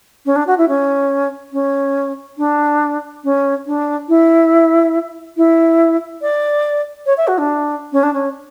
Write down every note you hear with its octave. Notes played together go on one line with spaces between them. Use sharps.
C#4
D4
F#4
E4
C#4
C#4
D4
C#4
D4
E4
E4
D5
C#5
E5
F#4
D4
C#4
D4
C#4